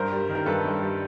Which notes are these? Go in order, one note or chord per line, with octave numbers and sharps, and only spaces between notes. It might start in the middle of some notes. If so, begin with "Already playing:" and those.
Already playing: G2 A#4 C5
G3
D#3
A#4
G2 A4 B4
G2
G3